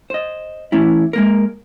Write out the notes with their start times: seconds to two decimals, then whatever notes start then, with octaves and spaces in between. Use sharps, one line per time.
0.10 C5 D#5
0.72 E3 A3 C#4 E4
1.13 G#3 A#3 A#4